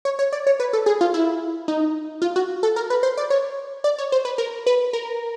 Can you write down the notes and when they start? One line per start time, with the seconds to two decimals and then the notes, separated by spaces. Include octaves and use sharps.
0.05 C#5
0.19 C#5
0.32 D5
0.47 C#5
0.60 B4
0.73 A4
0.86 G#4
1.01 F4
1.14 E4
1.68 D#4
2.22 F4
2.36 F#4
2.63 A4
2.76 A#4
2.90 B4
3.03 C5
3.17 D5
3.30 C#5
3.84 D5
3.98 C#5
4.12 C5
4.25 B4
4.38 A#4
4.66 B4
4.93 A#4